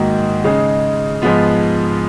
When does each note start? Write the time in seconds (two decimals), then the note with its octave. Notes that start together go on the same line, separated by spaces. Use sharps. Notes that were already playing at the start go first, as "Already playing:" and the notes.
Already playing: G#2 D#3 A#3 D#4 F#4
0.44 C#3 G#3 D#4
1.22 G#2 F3 G#3 B3 F4